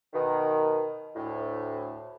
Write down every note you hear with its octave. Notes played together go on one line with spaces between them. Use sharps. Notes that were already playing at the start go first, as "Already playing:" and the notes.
B2 D#3
D2 A2